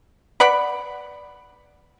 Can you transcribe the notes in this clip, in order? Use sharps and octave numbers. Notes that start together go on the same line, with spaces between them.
B4 D5 F#5 B5